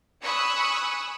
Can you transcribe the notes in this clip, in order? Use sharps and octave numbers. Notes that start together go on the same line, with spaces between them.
G#5 B5 C#6 D#6 E6 F#6